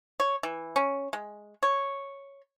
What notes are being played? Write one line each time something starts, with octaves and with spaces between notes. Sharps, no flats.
C#5
E3
C#4
G#3
C#5